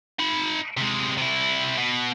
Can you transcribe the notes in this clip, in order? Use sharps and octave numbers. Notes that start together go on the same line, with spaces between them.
D#4 B5
C3 G#3
C3 E4
B2